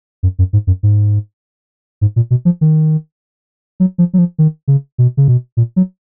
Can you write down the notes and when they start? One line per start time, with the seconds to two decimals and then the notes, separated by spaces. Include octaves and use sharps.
0.23 F#2
0.39 F#2
0.53 G#2
0.67 F#2
0.83 G#2
2.01 G#2
2.16 A#2
2.31 B2
2.45 F3
2.61 D#3
3.80 F#3
3.98 F3
4.13 F#3
4.18 F3
4.38 D#3
4.68 C#3
4.98 B2
5.17 C#3
5.28 B2
5.57 A#2
5.76 F#3